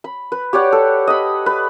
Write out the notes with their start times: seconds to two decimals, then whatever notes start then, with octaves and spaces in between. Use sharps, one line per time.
0.04 B5
0.32 B4
0.53 G4 C#5 D5 F#5
0.72 A4
1.08 D#5 B5
1.46 B4